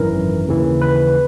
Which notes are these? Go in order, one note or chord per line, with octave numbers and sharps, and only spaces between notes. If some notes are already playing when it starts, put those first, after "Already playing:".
Already playing: G#1 F#2 E3 A#4
D#2 C#3 E3
B4